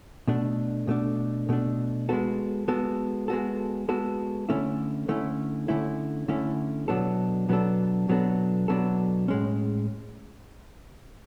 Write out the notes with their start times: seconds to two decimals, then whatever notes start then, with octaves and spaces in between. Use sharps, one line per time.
0.28 B2 A3 D4
0.87 B2 A3 D4
1.49 B2 A3 D4
2.09 G#3 B3 F#4 A4
2.68 G#3 B3 F#4 A4
3.28 G#3 B3 F#4 A4
3.89 G#3 B3 F#4 A4
4.49 D3 A3 C#4 E4
5.08 D3 A3 C#4 E4
5.68 D3 A3 C#4 E4
6.28 D3 A3 C#4 E4
6.88 B2 F#3 B3 D4 A4
7.49 B2 F#3 B3 D4 A4
8.09 B2 F#3 B3 D4 A4
8.68 B2 F#3 B3 D4 A4
9.28 A2 G#3 C#4